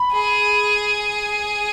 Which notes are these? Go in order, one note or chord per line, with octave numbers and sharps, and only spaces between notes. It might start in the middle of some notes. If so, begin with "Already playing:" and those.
Already playing: B5
G#4